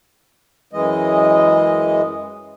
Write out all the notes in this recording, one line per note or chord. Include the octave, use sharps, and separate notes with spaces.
F#2 E3 G#3 D#5